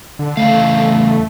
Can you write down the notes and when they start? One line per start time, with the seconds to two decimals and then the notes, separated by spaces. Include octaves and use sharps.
0.19 D3
0.37 E2 C#3 A3 F5